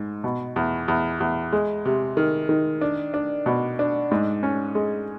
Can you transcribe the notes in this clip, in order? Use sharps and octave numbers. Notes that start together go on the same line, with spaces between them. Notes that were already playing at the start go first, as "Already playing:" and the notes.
Already playing: G#2
B2
E2
E2
E2
G#3
C3
D#3
D#3
D4
D4
B2
D4
G#2
C#4
G#3